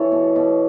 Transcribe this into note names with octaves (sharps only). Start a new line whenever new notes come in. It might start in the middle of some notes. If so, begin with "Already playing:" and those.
Already playing: E3 A4 C#5
B2
B2